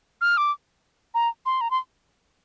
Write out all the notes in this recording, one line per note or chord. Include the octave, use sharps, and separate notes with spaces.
F6
D6
A#5
C6
A#5
C6